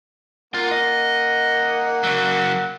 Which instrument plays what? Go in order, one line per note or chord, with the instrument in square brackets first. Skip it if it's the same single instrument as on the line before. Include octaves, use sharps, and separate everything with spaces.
[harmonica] A#3 F#5 [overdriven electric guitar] F4
[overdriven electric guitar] D#5
C#3 F#3